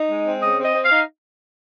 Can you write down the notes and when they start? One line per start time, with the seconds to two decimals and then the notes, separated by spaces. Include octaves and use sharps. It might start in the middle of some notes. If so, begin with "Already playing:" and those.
Already playing: D#4
0.10 G#3
0.26 C4
0.42 C#3 D#5
0.58 C4
0.64 D#5
0.74 C4
0.84 F5
0.91 D#4